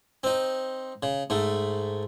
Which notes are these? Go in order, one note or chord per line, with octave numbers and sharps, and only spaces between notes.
C4 D#4
C#3
G#2 A3